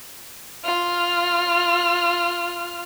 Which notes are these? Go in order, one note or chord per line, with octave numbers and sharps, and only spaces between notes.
F4 F6